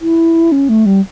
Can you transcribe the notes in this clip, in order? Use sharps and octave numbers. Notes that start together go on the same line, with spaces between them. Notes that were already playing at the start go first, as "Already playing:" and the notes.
E4
C#4
A3
G3